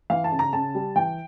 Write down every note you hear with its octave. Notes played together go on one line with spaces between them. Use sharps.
E3 F5
A5
C#3
A#5
C#3 A5
G3
E3 G5